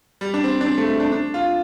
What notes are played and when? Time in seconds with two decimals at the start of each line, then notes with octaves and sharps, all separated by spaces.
0.21 G3
0.34 D4
0.44 C4
0.61 D4
0.66 C4
0.78 A3
0.89 A3
1.00 D4
1.12 D4
1.34 F4